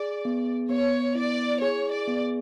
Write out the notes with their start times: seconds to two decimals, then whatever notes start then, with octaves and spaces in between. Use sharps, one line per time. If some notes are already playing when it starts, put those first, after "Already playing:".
Already playing: G#4 D5
0.25 B3
0.69 B3 C#5
1.15 E4 D5
1.62 G#4 C#5
1.92 D5
2.07 B3